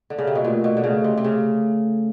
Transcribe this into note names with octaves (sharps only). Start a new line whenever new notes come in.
D3
C#3
C3
B2
A#2 A3
B2
D3
C#3 A3
C3
C3
C#3